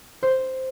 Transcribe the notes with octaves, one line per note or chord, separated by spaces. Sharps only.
C5